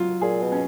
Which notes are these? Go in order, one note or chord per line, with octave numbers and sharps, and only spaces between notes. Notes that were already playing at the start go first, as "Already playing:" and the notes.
Already playing: F#3 F4
A#2 G#4
B2
C#4